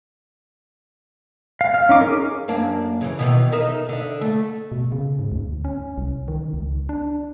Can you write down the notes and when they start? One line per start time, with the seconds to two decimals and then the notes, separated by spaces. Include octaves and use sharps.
1.61 F5
1.74 F5
1.89 C#4 D#4 D6
2.01 G#4 A#4
2.48 F#2 A#3 D4
3.01 C#3 E3
3.19 B2 D#3 E3
3.52 D#4 A#4 E5
3.89 D3 E5
4.21 A3
4.72 B2
4.92 C#3
5.19 G#2
5.32 D2
5.65 C#4
5.98 C2
6.28 D#3
6.54 C#2
6.89 D4